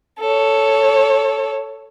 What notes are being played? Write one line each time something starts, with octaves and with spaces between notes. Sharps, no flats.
A4 C#5